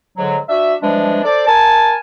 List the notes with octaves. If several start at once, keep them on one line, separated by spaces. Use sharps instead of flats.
G#2 D3 F#3
D4 F#4 E5
E3 F3 G3 G#3 D4
A4 C5 D5
A#4 G#5 A5